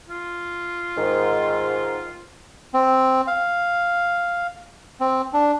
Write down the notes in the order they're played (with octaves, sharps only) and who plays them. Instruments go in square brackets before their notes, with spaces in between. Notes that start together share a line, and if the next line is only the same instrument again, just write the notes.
[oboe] F4
[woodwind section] G#2 D#3
[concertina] C4
F5
C4
D4